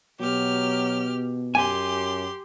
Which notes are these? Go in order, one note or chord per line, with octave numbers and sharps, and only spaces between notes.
B2 F#3 G4 F6
F#2 G4 G#5 C6